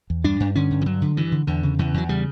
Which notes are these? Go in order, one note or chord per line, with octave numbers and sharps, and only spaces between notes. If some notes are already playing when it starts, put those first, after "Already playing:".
E2
G2 D4
G2
D3 C#4
G2
E3
D3 F#3
D3
G2 E3
D3
E2 D3
C#3
E2 E3
E2 F#3
C#3 G3